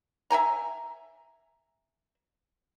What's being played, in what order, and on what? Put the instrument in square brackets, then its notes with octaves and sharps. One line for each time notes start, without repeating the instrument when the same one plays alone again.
[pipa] E5 G5 G#5 A#5